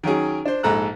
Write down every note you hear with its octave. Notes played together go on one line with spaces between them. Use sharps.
D#3 F#3 C#4 G#4
D4 C5
A#1 G#2 A4 A#5 F#6